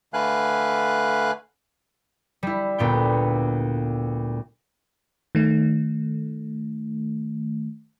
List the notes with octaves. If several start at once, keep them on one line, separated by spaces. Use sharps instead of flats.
D3 A3 B4 F5 G#5 F#6
G3 E4
D2 A#2 B3 G5
D#3 A3